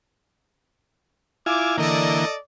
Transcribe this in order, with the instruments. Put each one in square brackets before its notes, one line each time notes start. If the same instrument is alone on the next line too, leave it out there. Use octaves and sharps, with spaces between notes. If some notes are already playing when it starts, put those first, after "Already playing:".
[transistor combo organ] E4 F4 G#5 [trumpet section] D6
[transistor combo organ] D3 E3 A#3 [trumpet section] A4 D5 D#5